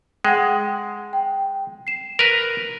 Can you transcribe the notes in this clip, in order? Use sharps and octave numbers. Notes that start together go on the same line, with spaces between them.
G#3 F#5 G5
G5
C7 E7
A#4 B4